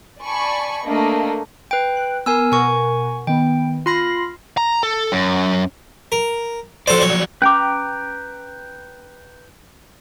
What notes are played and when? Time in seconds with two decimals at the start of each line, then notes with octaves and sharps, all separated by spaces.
0.20 D5 G#5 A5 B5 C#6
0.84 A3 A#3 D4 D#5
1.71 B4 G5
1.97 F#6
2.26 B3 A#4 G#5 E6
2.52 B2 A#4 F#5 G#5 C#6
3.27 D#3 B3 G5
3.86 F4 B5 C6 F6 A#6 C7
4.57 A#5
4.83 A4
5.12 F#2
6.12 A#4
6.87 F3 F#3 A4 C5 D5
7.01 C#5
7.42 C#4 B4 G5 A#5 D6